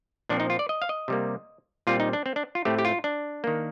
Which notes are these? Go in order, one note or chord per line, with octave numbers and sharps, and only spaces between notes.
A#2 F3 C4 D4
D#4
F4
D5
D#5
F5
D#5
C3 G3 A#3
A#2 G3 C4 F4
D#4
D4
C4
D4
F4
A2 A3 C4 G4
G4
F4
D4
D#3 A#3